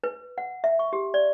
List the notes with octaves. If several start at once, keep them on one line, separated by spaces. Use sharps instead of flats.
B4
F#5
E5
C#6
G4
D5